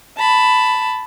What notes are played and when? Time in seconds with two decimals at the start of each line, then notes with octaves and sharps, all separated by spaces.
0.17 A5 B5